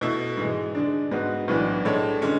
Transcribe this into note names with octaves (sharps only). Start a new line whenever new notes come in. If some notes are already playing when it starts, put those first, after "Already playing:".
B2 A3 E4
G#2 E3 G#3
D3 G#3 D4
G#2 G#3 B3 F#4
B1 A2 E3 B3 D4
A2 G#3 D4 A4 C#5
D3 G#3 C#4